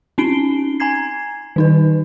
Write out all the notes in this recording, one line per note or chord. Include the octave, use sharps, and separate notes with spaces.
C4 C#4 D#4 C7 D7 G7
G#5 A#5 G#6 C7
D#3 D#4 B4